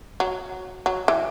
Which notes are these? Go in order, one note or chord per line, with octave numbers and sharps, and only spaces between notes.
F#3
F#3
E3